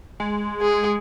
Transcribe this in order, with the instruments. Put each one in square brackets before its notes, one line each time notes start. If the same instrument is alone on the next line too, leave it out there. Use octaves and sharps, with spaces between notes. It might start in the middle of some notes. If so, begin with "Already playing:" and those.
[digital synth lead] G#3
[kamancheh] G#4